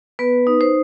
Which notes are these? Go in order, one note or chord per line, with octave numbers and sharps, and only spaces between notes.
B3 B4
D#4
C5